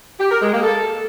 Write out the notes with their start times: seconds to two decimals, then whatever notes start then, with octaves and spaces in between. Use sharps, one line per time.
0.19 G4
0.30 A#4
0.41 G#3
0.52 A#3
0.63 A4